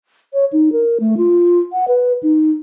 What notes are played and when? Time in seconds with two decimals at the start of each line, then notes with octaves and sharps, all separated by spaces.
0.33 C#5
0.52 D#4
0.72 A#4
1.00 A3
1.17 F4
1.73 F#5
1.88 B4
2.23 D#4